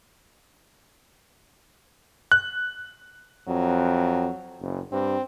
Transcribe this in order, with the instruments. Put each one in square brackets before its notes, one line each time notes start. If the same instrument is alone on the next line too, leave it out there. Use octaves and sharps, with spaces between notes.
[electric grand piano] F#6
[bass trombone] F2 [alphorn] F#3
[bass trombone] F#1
[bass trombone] G2 [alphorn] C4